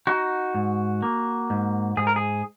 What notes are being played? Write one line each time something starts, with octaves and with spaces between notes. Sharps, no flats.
D#4 F#4
G#2
A#3
G#2
G#2 G#4
A#4
G#4